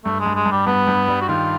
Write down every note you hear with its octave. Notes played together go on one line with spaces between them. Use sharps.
G2 A3
G#3
G2
G#3
G2
G3
G2 B3
G2
G3
F#4
D#3 F4